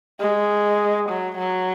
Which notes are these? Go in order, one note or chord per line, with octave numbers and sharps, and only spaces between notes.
G#3
F#3
F#3